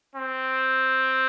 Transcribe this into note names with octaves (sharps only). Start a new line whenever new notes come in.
C4